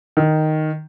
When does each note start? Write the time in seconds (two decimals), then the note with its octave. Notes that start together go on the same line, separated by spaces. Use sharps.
0.17 D#3